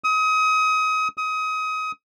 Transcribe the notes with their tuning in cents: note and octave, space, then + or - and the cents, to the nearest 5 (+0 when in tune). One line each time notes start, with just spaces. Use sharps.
D#6 +30
D#6 +25